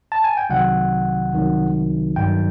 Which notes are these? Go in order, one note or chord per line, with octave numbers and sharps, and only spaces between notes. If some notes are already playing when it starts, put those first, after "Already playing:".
A5
G#5
G5
C2 C3 D#3 F#3 F#5
C2 C3 D#3 F#3
G2 D#3 F#3 G5